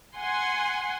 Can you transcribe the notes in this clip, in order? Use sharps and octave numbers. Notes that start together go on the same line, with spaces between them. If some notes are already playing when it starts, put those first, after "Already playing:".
F#5 G#5 C6